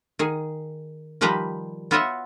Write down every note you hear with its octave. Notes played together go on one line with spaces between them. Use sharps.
D#3 G#4
D#3 F3 G3 G4 B4 A#5
B3 F4 F#4 C#5 D#5 E5